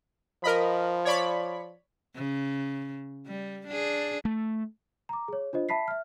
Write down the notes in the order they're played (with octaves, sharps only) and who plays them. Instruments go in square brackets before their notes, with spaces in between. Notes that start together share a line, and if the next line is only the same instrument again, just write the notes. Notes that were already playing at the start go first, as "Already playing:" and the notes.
[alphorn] F3 [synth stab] A#4 D#5 B5
[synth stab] C#5 D5 B5
[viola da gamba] C#3
G3
D4 G#4
[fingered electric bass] A3
[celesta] A#5 D6
G#4 C#5
D4 F4 C5 D#5
E5 A5 B5 B6 C7
E5 F6